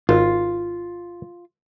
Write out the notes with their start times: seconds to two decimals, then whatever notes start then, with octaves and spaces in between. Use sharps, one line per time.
0.09 G#1 F4